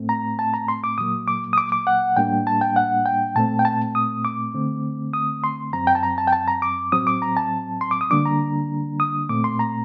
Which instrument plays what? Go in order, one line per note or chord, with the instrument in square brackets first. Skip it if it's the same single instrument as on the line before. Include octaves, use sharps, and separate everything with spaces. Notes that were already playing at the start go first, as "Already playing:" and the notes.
Already playing: [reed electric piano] A2 A3 C4
A#5
A5
A#5
C6
D6
A#2 F#3 A#3 D#6
D6
D#6
D6
D6
F#5
A2 G3 A#3 D4 G5
A5
G5
F#5
G5
A#2 A3 C4 A5
G5
A5
D#6
D6
D3 A3 C4
D#6
C6
F#2 F#3 C4 A#5
G5
A5
A#5
A5
G5
A5
A#5
D6
A2 F#3 C4 D#6
D6
A#5
A5
C6
D6
D#6
D3 G3 A#3 D4 D6
A#5
D#6
A#2 A3 C4 D6
C6
A#5